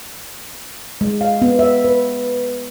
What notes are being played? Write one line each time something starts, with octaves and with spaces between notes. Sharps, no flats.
G#3
F5
B3
E5
B4